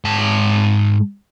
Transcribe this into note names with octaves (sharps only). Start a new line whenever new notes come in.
G#2 A5